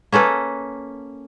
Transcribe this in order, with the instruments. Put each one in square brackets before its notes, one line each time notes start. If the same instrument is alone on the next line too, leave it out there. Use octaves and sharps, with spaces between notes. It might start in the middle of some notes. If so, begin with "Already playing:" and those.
[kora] A#3 C#4 A4 B4